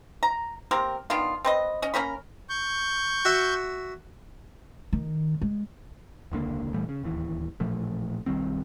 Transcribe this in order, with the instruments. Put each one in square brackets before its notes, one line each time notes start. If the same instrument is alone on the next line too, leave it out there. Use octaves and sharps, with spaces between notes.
[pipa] A#5
A#3 C4 G4 A#4
D#3 B3 D4 F4
C4 B4 D#5
C#4 D#5
A#3 C#4 A#4 B5
[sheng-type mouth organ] C#6 G6
[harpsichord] F#4 E5 F#5
[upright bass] D#3
G#3
[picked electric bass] E1 C#2 D3 A#3
A#2 E3 G3 A3
C#3
D1 D#2 E3
A1 A#2 F3 A3
B1 D#3 G3 C4